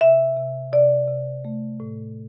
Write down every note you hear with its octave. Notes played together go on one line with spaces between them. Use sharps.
C3 E5
C3
C3 D5
C3
A3
A2